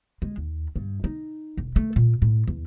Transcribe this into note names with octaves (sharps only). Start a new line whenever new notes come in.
G#3
D#2
G2
D#4
E1
A3
A#2
A2
E2